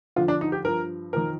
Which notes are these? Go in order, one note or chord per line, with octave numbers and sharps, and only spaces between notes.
F2 D3 F3 F4
D4
D#4
G4
G2 F3 A#4
F2 D#3 A#4